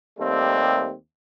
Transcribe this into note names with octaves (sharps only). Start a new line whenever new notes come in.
D#2 G3 A3 C4